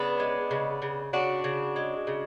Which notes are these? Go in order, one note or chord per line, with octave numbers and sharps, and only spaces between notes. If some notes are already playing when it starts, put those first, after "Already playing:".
Already playing: C#3 B3 D4
G#3
C#3
C#3
C#3 D4 F#4
C#3
G#3
C#3